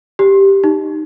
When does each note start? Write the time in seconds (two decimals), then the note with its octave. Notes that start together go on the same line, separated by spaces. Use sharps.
0.19 G4
0.64 D#4